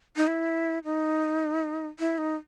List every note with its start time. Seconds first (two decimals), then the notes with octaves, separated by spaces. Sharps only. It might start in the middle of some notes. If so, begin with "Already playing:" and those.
0.16 D#4
0.27 E4
0.84 D#4
1.99 E4
2.18 D#4